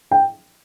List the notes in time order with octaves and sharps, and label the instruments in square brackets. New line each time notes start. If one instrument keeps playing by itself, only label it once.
[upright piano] G5